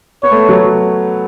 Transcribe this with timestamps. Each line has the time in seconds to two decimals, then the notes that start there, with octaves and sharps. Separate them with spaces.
0.23 B3 C#5
0.31 A3
0.49 F#3